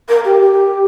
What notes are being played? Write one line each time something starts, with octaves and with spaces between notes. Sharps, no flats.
A#4
G4
G4